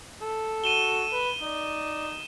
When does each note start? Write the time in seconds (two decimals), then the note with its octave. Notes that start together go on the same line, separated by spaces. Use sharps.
0.22 A4
0.64 F#4 D#7 E7 G7
1.12 B4
1.41 D#4 D5